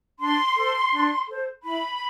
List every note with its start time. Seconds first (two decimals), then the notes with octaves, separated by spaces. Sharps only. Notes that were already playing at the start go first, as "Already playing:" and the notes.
0.19 D4 C6
0.56 A4 C5
0.92 D4
1.27 A4 C5
1.63 E4 B5